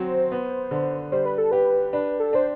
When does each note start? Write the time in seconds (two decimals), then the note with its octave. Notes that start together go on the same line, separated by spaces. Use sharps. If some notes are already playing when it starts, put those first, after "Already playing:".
Already playing: F#3 C4 C5
0.32 B3
0.71 D3
1.12 G3 C5
1.25 B4
1.38 A4
1.51 G4 B4
1.93 D4 B4
2.20 A4
2.33 D4 C5